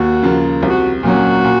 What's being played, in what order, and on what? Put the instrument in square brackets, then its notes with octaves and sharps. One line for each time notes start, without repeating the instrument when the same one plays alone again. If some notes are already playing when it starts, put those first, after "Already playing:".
Already playing: [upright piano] D#2 [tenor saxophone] F#4
[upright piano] C#3 F3 A#3 F4
[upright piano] C2 [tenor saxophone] F#4
[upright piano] A#2 F#3 A#3 C#4 [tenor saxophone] F#4
[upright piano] A#2